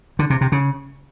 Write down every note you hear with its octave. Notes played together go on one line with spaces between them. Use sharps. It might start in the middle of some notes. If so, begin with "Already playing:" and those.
D3
C3
C3
C#3